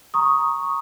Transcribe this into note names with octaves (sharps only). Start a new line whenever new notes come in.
A#5 C#6 D#6